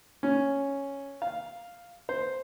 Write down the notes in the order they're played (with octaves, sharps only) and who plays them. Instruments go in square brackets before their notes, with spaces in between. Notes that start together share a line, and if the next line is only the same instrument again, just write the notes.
[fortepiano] C#4
F5
C5